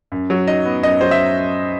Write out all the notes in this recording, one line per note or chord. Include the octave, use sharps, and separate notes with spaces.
F#2
F#3
D#4 D#5
B3
F#2 D#5
F#3 C5
E5